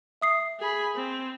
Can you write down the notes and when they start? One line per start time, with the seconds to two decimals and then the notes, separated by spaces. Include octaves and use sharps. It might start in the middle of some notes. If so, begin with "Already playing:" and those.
0.21 E5 D#6 C7
0.59 G#4 B5
0.95 C4